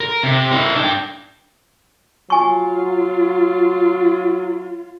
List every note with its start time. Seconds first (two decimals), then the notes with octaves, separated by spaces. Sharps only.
0.01 A#4
0.23 C3
0.52 E4 A#4
0.76 D4 G5
2.30 F#3 F4 G#5 C#6